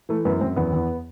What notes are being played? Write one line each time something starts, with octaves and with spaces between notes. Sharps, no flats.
E3 A3
F#2 B3
F#2 C4
E2 B3
E2